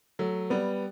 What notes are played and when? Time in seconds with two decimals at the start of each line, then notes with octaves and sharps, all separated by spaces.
0.19 F#3 A3
0.50 G3 B3